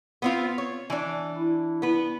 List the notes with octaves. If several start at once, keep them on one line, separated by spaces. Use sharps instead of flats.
B3 C4 F4
C#5
E3 D4
E4
B3 B4